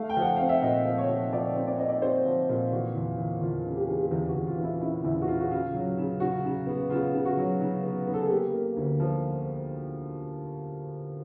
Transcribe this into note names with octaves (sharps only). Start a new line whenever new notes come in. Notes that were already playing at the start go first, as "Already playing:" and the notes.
Already playing: A3 F5
G5
F3
F#5
C4 F5
E5
A#2 D#5
F3
C#5
F3
F3 D5
C4
D5
C4 D#5
D5
C4 C5
F3
A#2
E3 F#4
E2
E2
E2 F4
C#3
G4
E3 G#4
G4
E2
F#4
E2
F4
E3
E4
C#3 E4
E2 E4
F#4
C#3 F4
F#4
C#3 F4
F#3
C#3
C#3 F#4
C#3
B3
C#3 F4
C#3
F#4
F#3
C#3
B3
B3
A4
G#4
A#3 G4
A#3
D2
F3